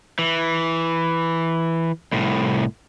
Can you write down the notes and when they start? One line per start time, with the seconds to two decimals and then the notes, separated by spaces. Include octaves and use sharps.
0.19 E3
2.13 C2 A2